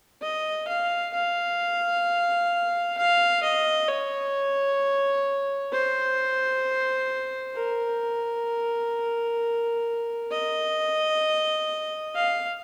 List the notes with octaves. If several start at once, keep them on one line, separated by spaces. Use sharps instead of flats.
D#5
F5
F5
F5
D#5
C#5
C5
A#4
D#5
F5